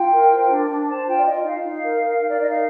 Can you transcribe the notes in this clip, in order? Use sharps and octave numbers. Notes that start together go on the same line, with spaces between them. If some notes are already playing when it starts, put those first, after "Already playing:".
Already playing: F4 G5
A#4
C5
D4
D4
C5 A5
F4 G5
D5
F4 D#5
D#4 F5
D#4
A#4
A#4
D#4
D5
D#4 D#5
F5